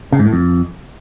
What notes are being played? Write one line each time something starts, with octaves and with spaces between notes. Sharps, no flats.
C#3
G#2
A2
F2